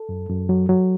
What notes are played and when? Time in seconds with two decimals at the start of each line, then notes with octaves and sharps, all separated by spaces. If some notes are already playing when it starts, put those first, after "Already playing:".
Already playing: A4
0.09 F#2
0.29 F#2
0.49 F#3
0.69 F#3